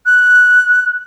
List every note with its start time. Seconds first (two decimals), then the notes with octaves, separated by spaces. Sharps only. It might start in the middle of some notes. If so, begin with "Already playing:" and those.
0.06 F#6